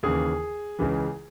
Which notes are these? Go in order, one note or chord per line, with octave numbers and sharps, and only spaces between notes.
D#2 C#3 E3 G#4
C#2 C#3 E3